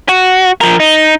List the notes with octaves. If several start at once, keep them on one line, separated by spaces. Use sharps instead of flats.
F#4
F3 A#4
D#4